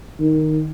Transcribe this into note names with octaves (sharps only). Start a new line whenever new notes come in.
D#3